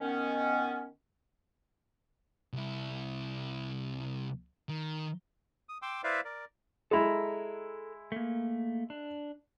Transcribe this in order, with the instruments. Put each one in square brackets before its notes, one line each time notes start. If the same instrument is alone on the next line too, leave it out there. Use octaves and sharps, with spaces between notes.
[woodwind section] D#3 B3 C#4
[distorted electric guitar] C2 E4
D#3
[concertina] D#6
G5 C6 D6 E6
E4 B4 C5 D5 E5 F5
A#4 D5
[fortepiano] G#3 E4 [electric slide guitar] A4 A#5
[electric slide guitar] A3 A#3
D4